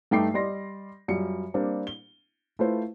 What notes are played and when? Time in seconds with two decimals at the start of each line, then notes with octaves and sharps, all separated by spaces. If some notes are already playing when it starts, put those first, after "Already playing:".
0.11 G2 A3 D#4 G5 D6 C7
0.34 G3 D5 D#5 C6 A#6
1.08 F#2 G3 F4 C#7
1.54 G3 A#3 C4 D4
1.87 G7
2.59 A3 E4 F4 B4 C5